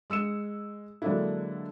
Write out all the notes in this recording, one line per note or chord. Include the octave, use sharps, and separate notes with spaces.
G#3 E6 C#7 E7
D3 F#3 G#3 A#3 D4 E4